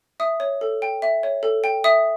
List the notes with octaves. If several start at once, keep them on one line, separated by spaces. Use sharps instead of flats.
E5 D#6
C#5
A4
G5
E5
C#5
A4
G5
E5 D#6